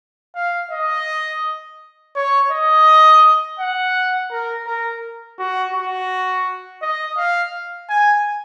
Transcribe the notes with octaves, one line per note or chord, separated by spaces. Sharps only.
F5
D#5
C#5
D#5
F#5
A#4
A#4
F#4
F#4
D#5
F5
G#5